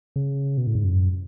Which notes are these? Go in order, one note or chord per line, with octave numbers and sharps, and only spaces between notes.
C#3
B2
A2
G#2
F#2